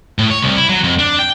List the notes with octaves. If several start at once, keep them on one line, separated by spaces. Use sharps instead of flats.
A2
C#5
C2
E4
F#3
F2
D4
G5